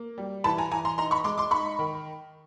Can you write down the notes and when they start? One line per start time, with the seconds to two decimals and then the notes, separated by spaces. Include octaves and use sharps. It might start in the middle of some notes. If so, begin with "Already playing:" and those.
Already playing: A#3
0.18 G3
0.44 E3 A5 B5
0.58 G#5 A#5
0.71 E3 G#5 A#5
0.85 A#5 C6
0.98 D#4 A#5 C6
1.11 B5 C#6
1.24 G#3 C6 D6
1.38 C6 D6
1.51 D#4 B5 C#6
1.79 D#3